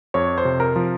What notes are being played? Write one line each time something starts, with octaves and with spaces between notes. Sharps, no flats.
F2 C#5
C5
C3
A#4
F3